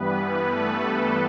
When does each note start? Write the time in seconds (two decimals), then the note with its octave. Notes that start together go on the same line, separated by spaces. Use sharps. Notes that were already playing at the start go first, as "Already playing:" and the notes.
Already playing: G2 E3 G3 B3 B4
0.20 B3 B4
0.51 A3 A4